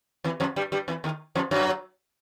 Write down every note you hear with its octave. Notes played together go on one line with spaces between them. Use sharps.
E2 E3
F2 F3
G2 G3
G2 G3
E2 E3
D#2 D#3
F2 F3
F#2 F#3